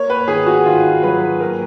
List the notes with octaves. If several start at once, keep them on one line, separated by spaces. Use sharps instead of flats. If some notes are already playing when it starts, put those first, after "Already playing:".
Already playing: A#3 C#5
B4
D#3 G#4
F#4
D#3 F4
F#3 B4
A#3 A#4